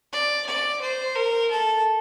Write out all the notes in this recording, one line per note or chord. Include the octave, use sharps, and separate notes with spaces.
D5
D5
C5
A#4
A4